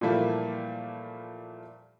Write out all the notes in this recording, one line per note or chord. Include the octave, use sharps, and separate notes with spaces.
A#2 E3 F3 G3 A3 A#3